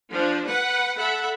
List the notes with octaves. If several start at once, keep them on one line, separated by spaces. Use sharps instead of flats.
F3 D4
B4 F#5
A4 E5 F#5 B5